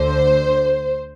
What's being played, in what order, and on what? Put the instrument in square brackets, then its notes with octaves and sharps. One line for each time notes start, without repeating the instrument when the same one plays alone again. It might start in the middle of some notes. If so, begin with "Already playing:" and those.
Already playing: [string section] D2 D3 C5